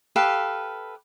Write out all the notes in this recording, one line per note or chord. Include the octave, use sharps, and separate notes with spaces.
G4 A4 B4 F5